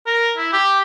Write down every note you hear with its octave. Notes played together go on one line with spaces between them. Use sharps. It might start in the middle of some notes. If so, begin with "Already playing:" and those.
A#4
E4
G4